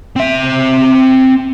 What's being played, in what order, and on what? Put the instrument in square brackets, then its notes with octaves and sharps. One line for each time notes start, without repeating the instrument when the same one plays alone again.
[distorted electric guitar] C4 E5